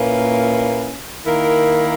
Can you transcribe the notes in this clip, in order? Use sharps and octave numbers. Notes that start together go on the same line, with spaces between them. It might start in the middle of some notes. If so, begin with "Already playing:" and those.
Already playing: A#2 A#3 C#4 E4 B4
D#3 A#3 E4 A#4